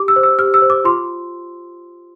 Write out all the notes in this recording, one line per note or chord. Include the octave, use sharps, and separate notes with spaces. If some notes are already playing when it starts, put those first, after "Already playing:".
Already playing: G4 D6
E6
C5
E6
G4 F6
E6
C5
D6
F4 C6